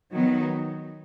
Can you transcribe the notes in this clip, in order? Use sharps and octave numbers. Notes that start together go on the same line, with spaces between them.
D#3 F#3 B3 D#4